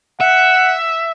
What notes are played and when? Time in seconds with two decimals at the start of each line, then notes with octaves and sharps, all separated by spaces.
0.21 E5 F#5